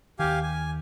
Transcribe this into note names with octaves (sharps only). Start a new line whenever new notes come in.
D#2 D#3 G4 F5 G#5
G#5